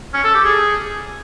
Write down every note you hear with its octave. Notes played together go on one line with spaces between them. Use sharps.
C#4
A4
G4
G#4